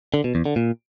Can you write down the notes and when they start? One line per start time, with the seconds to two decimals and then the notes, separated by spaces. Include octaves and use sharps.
0.14 D3
0.24 B2
0.35 E2
0.46 D3
0.56 A#2